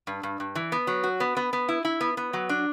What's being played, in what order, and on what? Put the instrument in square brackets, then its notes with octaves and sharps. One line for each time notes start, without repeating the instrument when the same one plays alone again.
[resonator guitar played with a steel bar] G2
G2
G2
E3
B3
F#3
F#4
B3
B3
B3
E4
E4
B3
B3
F#3
D4